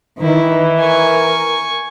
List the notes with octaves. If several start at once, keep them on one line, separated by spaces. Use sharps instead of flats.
D#3 E3 E4
A#4 G#5 C#6